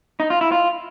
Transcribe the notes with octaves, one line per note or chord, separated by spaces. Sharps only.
D#4
F4
E4
F4